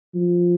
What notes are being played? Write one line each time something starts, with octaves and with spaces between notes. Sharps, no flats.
F3